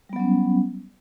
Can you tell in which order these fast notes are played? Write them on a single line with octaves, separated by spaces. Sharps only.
G3 B3 F#3 C#4